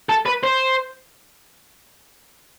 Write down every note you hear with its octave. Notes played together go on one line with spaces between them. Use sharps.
A4
B4
C5